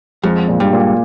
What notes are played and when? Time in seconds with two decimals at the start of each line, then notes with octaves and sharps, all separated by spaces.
0.23 F2 G#3
0.49 A#2
0.60 G2
0.73 A#2